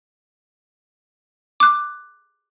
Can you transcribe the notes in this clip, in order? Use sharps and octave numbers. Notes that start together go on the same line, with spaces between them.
D6 F#6